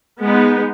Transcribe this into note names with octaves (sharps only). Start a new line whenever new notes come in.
G#3 B3 D#4